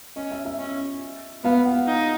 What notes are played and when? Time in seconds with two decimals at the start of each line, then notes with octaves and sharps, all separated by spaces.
0.16 C#4 D#5
0.31 E5
0.45 E5
0.59 C#4
1.44 B3 F5
1.65 F#5
1.87 D#4